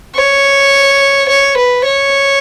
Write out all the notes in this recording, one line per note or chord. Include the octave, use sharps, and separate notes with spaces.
C#5
C#5
B4
C#5